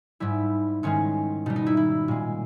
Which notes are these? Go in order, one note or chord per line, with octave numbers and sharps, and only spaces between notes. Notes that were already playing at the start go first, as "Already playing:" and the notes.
G#2 G3 E4
G#2 D#3 G#3 C#4
B2 G3 D#4
D#4
E4
E4
A#2 G#3